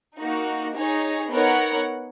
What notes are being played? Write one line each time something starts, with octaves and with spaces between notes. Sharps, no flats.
A#3 D#4 F#4
D#4 G#4 C#5
B3 D#4 A#4 C#5 F#5